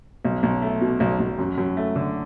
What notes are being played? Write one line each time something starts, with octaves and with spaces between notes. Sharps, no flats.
B1
B1
A3
B2
B1
B1
F#2
F#2
A3
D3